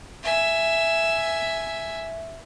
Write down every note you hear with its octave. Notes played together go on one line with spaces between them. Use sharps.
E5 G#5